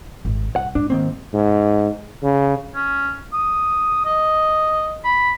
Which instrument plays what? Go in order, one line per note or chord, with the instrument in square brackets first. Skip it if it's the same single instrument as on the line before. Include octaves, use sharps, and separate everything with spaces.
[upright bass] G#1
[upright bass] C2 [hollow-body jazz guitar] F#5
[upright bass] G#2 [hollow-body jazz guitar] D4
[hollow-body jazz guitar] D#3 A#3 C4
[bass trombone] G#2
C#3
[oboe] C#4
D#6
D#5
B5